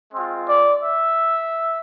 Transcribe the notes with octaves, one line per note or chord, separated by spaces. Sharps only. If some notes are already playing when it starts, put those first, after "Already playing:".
G#3 C4 F4
D5
E5